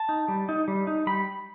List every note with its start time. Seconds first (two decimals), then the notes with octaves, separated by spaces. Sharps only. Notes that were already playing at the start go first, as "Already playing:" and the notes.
Already playing: A5
0.09 D#4
0.28 G3
0.49 D#4
0.68 G3
0.87 D#4
1.07 G3 B5